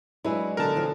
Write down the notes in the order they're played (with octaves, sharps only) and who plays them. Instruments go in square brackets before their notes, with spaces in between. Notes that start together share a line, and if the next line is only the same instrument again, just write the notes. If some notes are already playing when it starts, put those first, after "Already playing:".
[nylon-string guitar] F#3 G#3 D4 [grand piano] E4 B4
[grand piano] B2 D3 [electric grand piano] A#4 A5
[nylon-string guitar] E3 F3